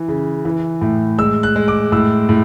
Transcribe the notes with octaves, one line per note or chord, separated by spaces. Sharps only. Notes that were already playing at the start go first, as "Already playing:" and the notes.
Already playing: E3
C#3
E3
A2
G#3 E6
F#6
G#3
D6
A2 E6
A2